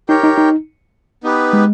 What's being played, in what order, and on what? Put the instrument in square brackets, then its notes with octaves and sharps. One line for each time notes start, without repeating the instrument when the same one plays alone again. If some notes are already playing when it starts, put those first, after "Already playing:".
[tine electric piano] D#4 [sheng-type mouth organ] G4 A#4 C#5 G5
[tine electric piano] D#4
D#4
[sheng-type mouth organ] B3 D#4 G4 B4
[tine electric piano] G#3